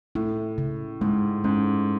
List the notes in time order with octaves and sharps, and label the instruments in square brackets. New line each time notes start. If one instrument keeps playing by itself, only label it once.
[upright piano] A2 [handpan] E4
[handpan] C#3
[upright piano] G#2 [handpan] G#3
[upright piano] G#2 [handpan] C#4